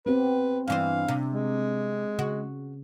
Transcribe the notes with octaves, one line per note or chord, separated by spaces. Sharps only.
B3 C4 G4 B4
G2 E3 C5 F5
C3
G#3
C#3 F#4